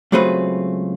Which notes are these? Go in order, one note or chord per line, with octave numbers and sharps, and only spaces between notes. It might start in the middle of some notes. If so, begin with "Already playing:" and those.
C#2 F#3 A3 C4 G#4 B4